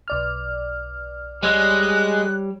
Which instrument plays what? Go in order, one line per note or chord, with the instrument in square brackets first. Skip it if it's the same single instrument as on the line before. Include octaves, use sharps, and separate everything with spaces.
[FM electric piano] B1 D5 F6
[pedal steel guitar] G3 C#5 E6 [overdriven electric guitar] G#3 [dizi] F#6